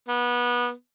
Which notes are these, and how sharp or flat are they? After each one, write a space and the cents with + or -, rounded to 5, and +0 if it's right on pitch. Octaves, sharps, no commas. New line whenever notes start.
B3 -25